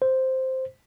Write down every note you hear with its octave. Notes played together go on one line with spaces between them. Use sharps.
C5